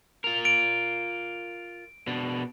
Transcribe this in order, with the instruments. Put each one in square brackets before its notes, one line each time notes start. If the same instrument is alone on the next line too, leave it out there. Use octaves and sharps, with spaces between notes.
[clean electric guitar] F4 A#4
[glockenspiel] D7
[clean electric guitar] B2 D4